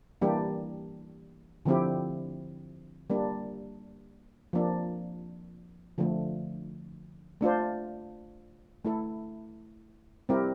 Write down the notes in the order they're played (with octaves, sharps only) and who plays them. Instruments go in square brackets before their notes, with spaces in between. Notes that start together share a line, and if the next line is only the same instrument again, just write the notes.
[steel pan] E3 G3 A#3 D4 G4
D3 F3 C4 E4 G4
G3 A#3 D4
F3 A#3 D4
D3 F3 A3
A3 D4 F4 C5
A3 E4 A4
G3 C4 E4 G4 A#4